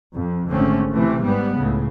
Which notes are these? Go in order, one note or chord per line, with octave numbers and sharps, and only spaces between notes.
F2
G#1 D3 A3 C4 C#4
C3 E3 A3
G#2 G3 B3
C#2 A2 C#3